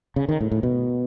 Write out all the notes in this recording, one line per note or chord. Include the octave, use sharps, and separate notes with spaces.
C#3
D#3
A2
A2
B2